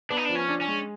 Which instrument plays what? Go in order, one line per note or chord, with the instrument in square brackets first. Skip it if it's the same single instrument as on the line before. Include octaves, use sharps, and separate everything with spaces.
[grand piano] B3 [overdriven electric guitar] D4
[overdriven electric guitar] D#4
[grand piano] F3 [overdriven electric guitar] D4
[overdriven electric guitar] C#4
[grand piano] D4
[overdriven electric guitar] C#4
[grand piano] G#3